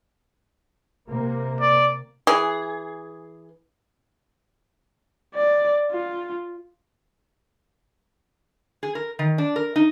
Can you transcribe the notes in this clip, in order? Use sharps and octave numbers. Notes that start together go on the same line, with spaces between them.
C3 A#3
D5
E3 G#4
D5
F4
G#4
A#4
D#3
D4
A#4
D#4